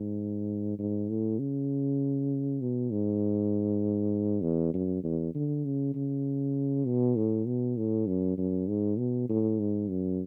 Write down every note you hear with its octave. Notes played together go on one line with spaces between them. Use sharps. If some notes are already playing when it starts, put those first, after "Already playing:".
Already playing: G#2
G#2
A2
C#3
B2
G#2
E2
F#2
E2
D3
C#3
C#3
B2
A2
B2
A2
F#2
F#2
G#2
B2
A2
G#2
F#2